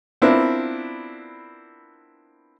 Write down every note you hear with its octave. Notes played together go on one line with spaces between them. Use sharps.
B3 C4 D4 E4 F4 A#4